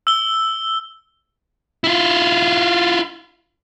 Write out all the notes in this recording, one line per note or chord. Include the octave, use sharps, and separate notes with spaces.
E6 G7
E4 F4